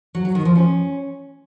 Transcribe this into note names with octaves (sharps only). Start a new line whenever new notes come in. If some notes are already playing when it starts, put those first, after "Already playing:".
F#3
F#3
D#3
F3
C#4